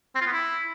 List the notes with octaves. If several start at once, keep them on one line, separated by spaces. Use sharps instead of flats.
C4
F4
B3
E4